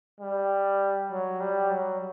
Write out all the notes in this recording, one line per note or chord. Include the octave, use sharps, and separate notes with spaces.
G3
F#3
G3
F#3